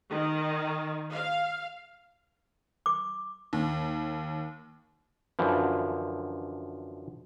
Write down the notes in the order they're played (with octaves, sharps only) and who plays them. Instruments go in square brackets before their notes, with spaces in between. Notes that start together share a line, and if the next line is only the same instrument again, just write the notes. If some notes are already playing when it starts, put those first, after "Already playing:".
[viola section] D#3
F5
[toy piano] D6
[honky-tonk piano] D#2
[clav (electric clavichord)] F#2 D3 E3 F3